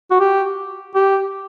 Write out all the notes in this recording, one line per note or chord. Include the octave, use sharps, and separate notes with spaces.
F#4
G4
G4